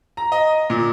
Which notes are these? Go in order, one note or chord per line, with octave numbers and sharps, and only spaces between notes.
A#5
D#5
A#2